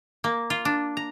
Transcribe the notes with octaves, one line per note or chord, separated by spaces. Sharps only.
A#3
F4
D4
A#5